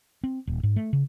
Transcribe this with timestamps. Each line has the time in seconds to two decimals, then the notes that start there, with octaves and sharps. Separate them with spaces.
0.24 C4
0.47 D#1
0.63 G#2
0.76 A3
0.93 C#3